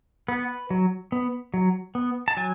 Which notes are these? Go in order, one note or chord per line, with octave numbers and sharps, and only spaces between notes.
B3 B4
F#3
B3
F#3
B3
A5
F#3 G#5